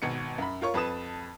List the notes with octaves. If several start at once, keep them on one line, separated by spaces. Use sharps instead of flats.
G#1 B2 C#7
F#2 B5
F4 A#4 C#5 C#6
F2 B4 A5 D#6 E7